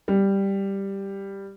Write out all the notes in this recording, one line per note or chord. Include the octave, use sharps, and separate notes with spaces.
G3